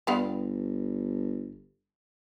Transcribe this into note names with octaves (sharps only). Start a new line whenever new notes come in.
G1 G3 B3 F5